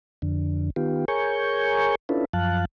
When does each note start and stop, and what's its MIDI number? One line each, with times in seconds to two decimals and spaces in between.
0.22 0.70 41
0.22 0.70 50
0.76 1.05 51
0.76 1.05 59
0.76 1.05 65
0.76 1.05 67
1.08 1.95 68
1.08 1.95 70
1.08 1.95 73
1.08 1.95 80
1.08 1.95 85
1.08 1.95 91
2.09 2.25 61
2.09 2.25 62
2.09 2.25 64
2.09 2.25 65
2.09 2.25 69
2.09 2.25 71
2.33 2.65 42
2.33 2.65 53
2.33 2.65 77
2.33 2.65 81
2.33 2.65 90